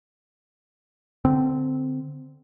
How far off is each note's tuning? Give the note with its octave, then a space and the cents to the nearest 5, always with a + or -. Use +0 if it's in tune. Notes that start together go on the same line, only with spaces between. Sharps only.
D3 +0 C4 -15